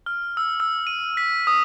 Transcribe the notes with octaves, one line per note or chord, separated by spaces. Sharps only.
F6
E6
E6
D#7
B6
D#6